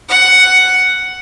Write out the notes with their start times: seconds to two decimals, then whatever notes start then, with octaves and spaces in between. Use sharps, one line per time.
0.10 F#5